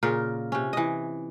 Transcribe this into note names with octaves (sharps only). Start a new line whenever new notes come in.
A#2 C#3 F4 A#4
C3 C#4
E3 D#5